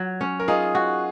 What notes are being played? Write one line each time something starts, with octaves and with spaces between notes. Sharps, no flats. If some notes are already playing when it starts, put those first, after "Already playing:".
Already playing: F#3
C#4
A#4
D#4 F4 G#4
F#4